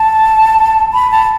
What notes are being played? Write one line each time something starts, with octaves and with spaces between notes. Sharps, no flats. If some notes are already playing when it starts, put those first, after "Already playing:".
Already playing: A5
B5
A5